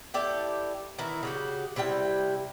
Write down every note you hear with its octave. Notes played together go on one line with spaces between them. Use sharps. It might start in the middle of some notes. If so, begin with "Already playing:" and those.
E4 G4 A4 D5
D#3 E3 E4
C#3 F#4 G4
C3 G3 E4 G5